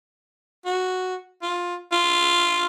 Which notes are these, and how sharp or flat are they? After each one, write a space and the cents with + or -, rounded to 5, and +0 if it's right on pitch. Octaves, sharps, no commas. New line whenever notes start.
F#4 +0
F4 +15
F4 -5